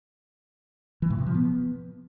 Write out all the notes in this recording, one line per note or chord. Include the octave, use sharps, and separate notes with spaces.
E3
A2
C3
F3
B3